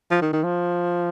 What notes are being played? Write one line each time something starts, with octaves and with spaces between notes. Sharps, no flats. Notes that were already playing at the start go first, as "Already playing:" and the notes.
F3
D#3
D#3
F3